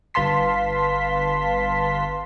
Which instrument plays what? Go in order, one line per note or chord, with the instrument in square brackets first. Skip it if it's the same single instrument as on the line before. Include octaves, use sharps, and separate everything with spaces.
[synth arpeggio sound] G1 B4 F5 A5 C6 B6